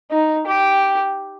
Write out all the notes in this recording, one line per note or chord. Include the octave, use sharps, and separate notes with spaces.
D#4
G4